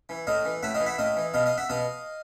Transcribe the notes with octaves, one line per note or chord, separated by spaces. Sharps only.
E3
A2 D#5 F5
E3
A2 E5 F#5
D#5 F5
E3
E5 F#5
A2 D#5 F5
E3
B2 D#5 F5
D#5 F5
E5 F#5
B2 D#5 F5